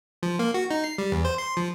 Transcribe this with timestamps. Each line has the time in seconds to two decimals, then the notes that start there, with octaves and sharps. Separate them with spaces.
0.23 F3
0.39 A#3
0.54 F#4
0.71 D#4
0.84 C7
0.98 G3
1.12 E2
1.25 C5
1.38 C6
1.57 F3